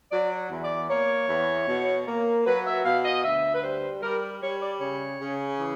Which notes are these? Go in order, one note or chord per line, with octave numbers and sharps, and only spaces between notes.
F#3 D5
E2
D5
A#3 C#5
E2
B2
A#3
F#3 B4
E5
B2 F5
D#5
D2 E5
B4
G3 C5
G3 A#4
G3 C#5
D5
C#3 C#5
C#3
E3